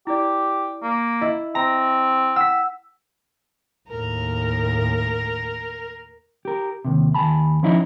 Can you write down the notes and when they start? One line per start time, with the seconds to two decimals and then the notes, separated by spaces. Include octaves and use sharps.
0.07 E4 G4 D5
0.83 A#3
1.21 E4 D#5
1.55 C4 A#5
2.36 F#5 G5 E6 B6
3.89 D#2 A2 A#4
6.45 G4 A#4
6.85 D#2 C3
7.14 D#2 G#5 A5 B5
7.63 F3 C#4 D#4 E4 C#5 D#5